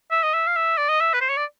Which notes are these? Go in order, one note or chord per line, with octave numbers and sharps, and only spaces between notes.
E5
D#5
E5
F5
E5
D5
D#5
E5
B4
C5
C#5
D5